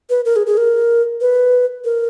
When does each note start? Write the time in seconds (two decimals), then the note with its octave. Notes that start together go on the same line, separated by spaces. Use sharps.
0.10 B4
0.25 A#4
0.36 G#4
0.47 G#4
0.57 A#4
1.21 B4
1.85 A#4